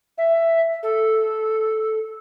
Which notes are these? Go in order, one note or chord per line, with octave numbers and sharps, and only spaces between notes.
E5
A4